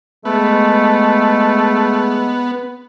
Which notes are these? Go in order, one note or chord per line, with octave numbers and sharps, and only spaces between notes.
G#3 A3 B3